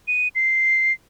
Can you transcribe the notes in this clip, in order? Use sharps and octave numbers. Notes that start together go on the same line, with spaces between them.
D#7
C7